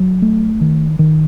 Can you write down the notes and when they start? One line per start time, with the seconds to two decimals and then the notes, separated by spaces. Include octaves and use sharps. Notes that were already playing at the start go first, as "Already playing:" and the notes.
Already playing: F#3
0.22 A3
0.61 D#3
0.99 D#3